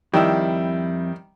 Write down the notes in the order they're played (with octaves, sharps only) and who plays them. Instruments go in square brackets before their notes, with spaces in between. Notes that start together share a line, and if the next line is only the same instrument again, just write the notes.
[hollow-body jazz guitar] F2 E4 [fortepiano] D#3 G3